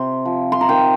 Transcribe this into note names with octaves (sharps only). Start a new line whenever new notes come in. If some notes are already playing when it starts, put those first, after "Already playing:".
Already playing: C3 C6
F3
C6
A#5
D#3 G5